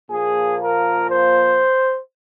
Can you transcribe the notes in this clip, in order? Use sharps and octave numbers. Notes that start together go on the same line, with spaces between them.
A#2 F3 A#3 G#4
A#4
C5